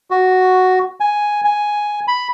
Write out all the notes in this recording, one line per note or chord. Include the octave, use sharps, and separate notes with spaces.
F#4
G#5
G#5
B5